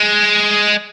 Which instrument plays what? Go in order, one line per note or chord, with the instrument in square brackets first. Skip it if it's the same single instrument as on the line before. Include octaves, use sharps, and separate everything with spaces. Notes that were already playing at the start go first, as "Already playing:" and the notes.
Already playing: [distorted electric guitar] G#3